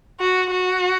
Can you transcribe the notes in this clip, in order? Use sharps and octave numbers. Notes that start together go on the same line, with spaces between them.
F#4
F#4